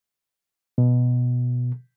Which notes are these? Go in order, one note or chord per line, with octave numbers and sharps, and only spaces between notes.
B2